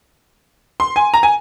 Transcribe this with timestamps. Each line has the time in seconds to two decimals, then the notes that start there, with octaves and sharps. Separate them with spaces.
0.80 C6
0.96 G#5
1.14 A#5
1.23 G#5